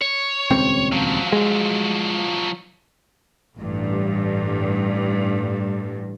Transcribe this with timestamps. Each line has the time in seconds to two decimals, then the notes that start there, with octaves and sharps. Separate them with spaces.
0.02 C#5
0.50 D#1 C#2 C4
0.92 F3 F#3
1.32 G#3
3.57 A1 G2